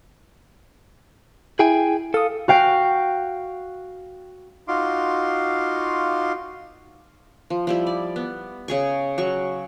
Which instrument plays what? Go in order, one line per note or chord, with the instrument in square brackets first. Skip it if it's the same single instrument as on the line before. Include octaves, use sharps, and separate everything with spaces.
[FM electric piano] E4 [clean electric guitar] G#4 G5 G#5
[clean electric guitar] A4 [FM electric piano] F5 D#6
[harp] F#4 F5 G5
[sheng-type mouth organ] D#4 F4 F#4 F5 C6 D6
[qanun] F3
F3 G3 E4
D5
B3
C#3 G#4 C#6
F#3 C#6